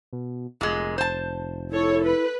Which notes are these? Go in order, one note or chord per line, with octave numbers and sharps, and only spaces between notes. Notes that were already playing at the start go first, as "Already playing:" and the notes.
B2
F1 A#2 G#3
C5 A5
E4 A4 C#5
B4